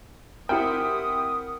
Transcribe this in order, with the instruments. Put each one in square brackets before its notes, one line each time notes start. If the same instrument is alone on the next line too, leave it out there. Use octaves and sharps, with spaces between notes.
[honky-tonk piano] C4 E4 G4 [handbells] A#4 F#5 [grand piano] G5 [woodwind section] D#6